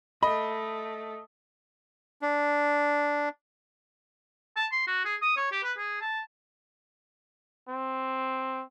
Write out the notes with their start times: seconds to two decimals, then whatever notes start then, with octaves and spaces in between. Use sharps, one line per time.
0.23 A3 D#5 B5
2.22 D4
4.56 A5
4.72 C6
4.87 F#4
5.05 G#4
5.22 D#6
5.37 C#5
5.52 G4
5.63 B4
5.77 G#4
6.01 A5
7.69 C4